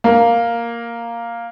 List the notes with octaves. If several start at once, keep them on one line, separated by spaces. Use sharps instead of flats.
A#3